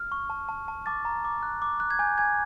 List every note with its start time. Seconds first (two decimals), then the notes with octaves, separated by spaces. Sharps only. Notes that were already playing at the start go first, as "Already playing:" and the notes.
Already playing: F6
0.12 C#6
0.30 A5
0.49 A5
0.68 A5
0.86 A5 D6 A6
1.05 A#5
1.25 D6
1.43 F#6
1.62 D6
1.80 F#6
1.90 G#6
1.99 G#5 G6
2.18 G#5 G#6